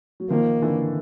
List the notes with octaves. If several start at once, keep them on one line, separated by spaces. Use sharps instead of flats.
F#3
D#3 F3 A#3
D3 E3